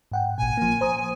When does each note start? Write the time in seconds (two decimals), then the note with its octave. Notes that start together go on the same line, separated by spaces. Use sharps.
0.12 G#2 F#5 G5
0.38 A1 A#2 G#5
0.57 F3 A#3
0.81 C5 A#5 D#6